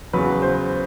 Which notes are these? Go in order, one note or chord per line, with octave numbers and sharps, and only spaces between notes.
E2 C#3 F#3 B4
C5